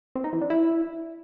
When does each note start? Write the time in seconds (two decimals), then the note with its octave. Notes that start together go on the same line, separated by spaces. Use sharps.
0.15 C4
0.24 D#4
0.33 E3
0.41 D4
0.50 E4